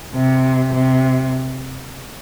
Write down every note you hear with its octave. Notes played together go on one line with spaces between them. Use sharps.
C3
C3